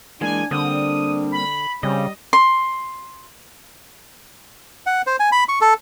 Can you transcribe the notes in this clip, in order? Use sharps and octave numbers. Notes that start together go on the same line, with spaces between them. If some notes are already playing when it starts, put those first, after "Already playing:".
E3 G#3 A#3 D4 G#5
D3 G3 A#3 C4 D4 D#6
B5
C#3 G3 C4 C#4 D#5
C6
F#5
C5
G#5
B5
C#6
A4